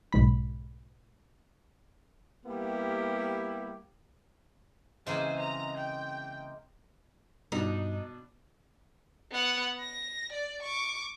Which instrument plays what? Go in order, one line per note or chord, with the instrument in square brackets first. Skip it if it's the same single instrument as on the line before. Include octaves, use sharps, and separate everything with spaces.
[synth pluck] B1 G#2 B5
[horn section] G3 A#3 B3 E4 G4
[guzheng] C#3 E3 C4 [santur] G#3 A#3 [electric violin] G#4 C5
[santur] D#5 [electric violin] A#5
[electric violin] G5
[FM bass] G2 [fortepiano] B2 D4 [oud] D#4
[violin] B3 F#5
A#6
D5
C#6 D6